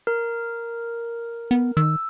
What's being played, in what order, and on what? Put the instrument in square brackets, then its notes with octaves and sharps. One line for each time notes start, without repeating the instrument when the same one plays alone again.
[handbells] A#4
[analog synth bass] B3
[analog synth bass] D#3 [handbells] E6